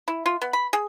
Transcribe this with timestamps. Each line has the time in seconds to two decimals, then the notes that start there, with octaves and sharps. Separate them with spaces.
0.08 E4
0.26 F4
0.42 B3
0.53 B5
0.73 G#4